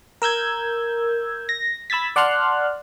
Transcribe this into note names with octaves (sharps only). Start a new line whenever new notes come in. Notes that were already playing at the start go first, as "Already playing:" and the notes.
A#4 E6 G6 G#6
A#6
B5 E6 G#6 A6 B6
D5 F#5 A5 C6 F6 F#6